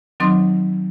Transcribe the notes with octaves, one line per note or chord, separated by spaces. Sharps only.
D#3 F#3 C4 D#4 C6 D6